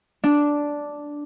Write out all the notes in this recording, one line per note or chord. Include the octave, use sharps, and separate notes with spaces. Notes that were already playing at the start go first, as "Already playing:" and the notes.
D4